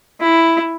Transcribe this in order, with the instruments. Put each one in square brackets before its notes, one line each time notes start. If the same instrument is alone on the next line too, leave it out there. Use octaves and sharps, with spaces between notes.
[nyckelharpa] E4